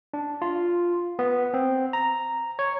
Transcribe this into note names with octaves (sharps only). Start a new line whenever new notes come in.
D4
F4
B3
C4
A#5
C#5